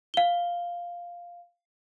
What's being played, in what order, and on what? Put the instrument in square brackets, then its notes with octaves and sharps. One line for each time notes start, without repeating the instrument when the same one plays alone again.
[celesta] F5 G7